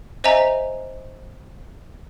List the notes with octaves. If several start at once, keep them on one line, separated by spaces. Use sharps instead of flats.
C5 D#5 E5 G#5 A#5